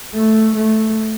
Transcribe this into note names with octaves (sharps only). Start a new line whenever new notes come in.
A3
A3